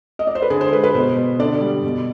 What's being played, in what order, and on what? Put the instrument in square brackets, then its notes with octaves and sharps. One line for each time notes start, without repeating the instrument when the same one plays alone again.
[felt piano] D#5
D5
C5
B4
D3 G#4
C5
G#3 B4
B4
B2 C5
B2
D3 D5
G3
B2